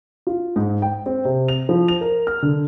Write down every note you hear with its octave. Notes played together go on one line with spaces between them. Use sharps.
F4
G#2
G5
C4
C3
F7
F3
F7
A#4
F6
D3